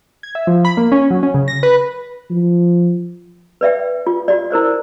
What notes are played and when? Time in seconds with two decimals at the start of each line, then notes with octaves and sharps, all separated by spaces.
0.23 G#6
0.35 E5
0.47 F3
0.65 B5
0.77 A#3
0.92 C#4
1.11 F#3
1.23 C#4
1.34 C#3
1.48 A#6
1.63 B4
2.30 F3
3.61 B4 D5 E5 G5
4.07 F4
4.28 F4 F#4 D5
4.51 E4 A#4 C5 D5